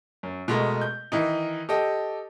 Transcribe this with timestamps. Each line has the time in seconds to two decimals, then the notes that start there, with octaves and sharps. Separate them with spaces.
0.23 F#2
0.48 B2 G#3 A3 A#4
0.81 G6
1.12 D#3 E3 D#4
1.69 G4 A4 D#5